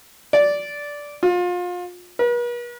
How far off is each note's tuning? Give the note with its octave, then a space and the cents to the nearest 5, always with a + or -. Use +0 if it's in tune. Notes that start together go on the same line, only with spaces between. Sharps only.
D5 -10
F4 +30
B4 -45